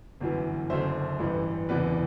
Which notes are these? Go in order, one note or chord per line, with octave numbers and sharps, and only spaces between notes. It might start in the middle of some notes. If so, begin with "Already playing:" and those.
G1 F#2 E3
F#1 F#2 D3 C5 E5
A1 G2 E3
F#1 E2 C3 E3 B4 D5